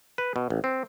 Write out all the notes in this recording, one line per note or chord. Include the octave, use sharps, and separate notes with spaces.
B4
B2
A1
C4